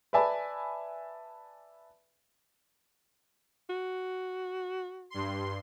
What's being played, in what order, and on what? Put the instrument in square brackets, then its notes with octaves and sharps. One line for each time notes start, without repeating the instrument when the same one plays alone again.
[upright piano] B4 D5 E5 G#5 A5 B5
[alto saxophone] F#4
[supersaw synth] G2 C6